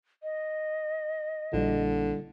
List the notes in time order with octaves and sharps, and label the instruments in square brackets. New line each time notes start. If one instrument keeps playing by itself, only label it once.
[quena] D#5
[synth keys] A#1 [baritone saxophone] D3 [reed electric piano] G3 E4